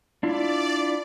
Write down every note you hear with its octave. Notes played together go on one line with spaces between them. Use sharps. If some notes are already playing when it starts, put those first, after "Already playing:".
D4 E4 F4 D5